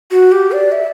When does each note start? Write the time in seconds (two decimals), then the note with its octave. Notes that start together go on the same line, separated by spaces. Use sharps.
0.11 F#4
0.32 G4
0.52 D5
0.72 E5